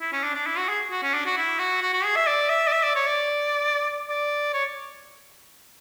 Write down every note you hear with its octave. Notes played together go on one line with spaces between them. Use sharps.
E4
C#4
D4
D4
E4
F#4
G#4
F#4
C#4
D4
F#4
E4
F#4
F#4
F#4
G#4
E5
D5
E5
D5
E5
D5
C#5
D5
D5
C#5